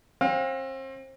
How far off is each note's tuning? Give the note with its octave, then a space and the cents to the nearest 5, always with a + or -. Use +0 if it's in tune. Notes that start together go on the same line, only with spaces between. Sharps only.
C4 +35 F5 +45